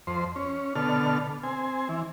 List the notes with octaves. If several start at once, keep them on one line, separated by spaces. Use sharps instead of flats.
F2 C5
C#4
B2 D3 A4 F6
C4 G#5
E3